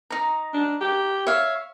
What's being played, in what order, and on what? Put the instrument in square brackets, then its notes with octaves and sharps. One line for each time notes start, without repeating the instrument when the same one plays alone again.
[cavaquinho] D#4 A#5
[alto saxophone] D4
G4
[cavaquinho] C#5 F5 [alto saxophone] E5